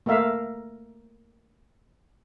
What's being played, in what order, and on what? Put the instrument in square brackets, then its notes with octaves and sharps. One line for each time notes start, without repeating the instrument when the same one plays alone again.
[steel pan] A3 A#3 A#4 E5 F5